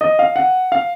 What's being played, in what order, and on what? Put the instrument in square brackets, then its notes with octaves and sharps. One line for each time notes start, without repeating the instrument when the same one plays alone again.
[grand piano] D#5
F5
F#5
F5